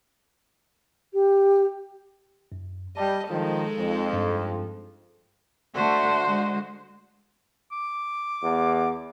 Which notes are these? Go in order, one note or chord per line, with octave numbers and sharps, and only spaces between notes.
G4
F#2
G3 D#5 A5
D#3 F3 G#3 D#4 A4
F2 F3
G2
D3 A3 F#4 C5
D3 G#3
D6
E2